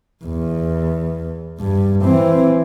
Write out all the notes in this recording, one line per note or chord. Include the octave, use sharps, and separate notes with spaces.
E2
G2
E3 C4